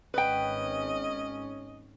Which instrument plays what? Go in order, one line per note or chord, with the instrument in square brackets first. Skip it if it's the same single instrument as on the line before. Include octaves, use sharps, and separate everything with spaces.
[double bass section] G#1 C#4 [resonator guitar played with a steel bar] B4 G5 [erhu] D#5